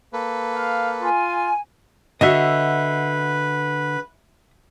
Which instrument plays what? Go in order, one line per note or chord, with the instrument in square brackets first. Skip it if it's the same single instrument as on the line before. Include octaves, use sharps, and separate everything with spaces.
[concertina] A#3 A4 B4
[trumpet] F5
[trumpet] F4 [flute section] G#5
[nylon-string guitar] D3 F#4 [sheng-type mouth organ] B4 [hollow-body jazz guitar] D#5 E5